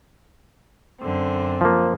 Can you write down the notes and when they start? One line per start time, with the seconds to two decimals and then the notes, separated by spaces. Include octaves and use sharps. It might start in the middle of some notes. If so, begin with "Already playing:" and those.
1.00 F#2 D3 C4
1.61 F3 A#3